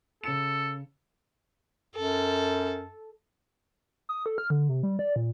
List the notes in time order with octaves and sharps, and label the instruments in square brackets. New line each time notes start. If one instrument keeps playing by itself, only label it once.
[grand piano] C#3 C#7 E7 [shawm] A4
[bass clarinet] F#2 [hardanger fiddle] A4
[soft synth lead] D#6
A4
F6
D3
C3
G3
D5
A#2